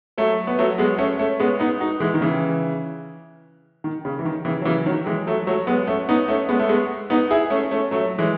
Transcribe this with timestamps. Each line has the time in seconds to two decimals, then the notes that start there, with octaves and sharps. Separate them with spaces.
0.18 F#3 A3
0.47 B3
0.58 F#3 A3
0.78 G#3 B3
0.98 A3 C#4
1.19 A3 C#4
1.39 G#3 B3
1.60 B3 D#4
1.80 D#4 F#4
2.00 E3 G#3
2.14 D#3
2.21 C#3 E3
3.84 D#3
4.05 C#3
4.19 E3
4.25 D#3
4.45 C#3 E3
4.62 F#3
4.65 C#3 E3
4.86 D#3 F#3
5.06 E3 G#3
5.27 F#3 A3
5.47 F#3 A3
5.67 G#3 B3
5.87 A3 C#4
6.09 B3 D#4
6.28 A3 C#4
6.49 G#3 B3
6.59 A3
6.69 G#3 B3
7.10 B3 D#4
7.31 E4 G#4
7.50 A3 C#4
7.71 A3 C#4
7.91 F#3 A3
8.19 E3 G#3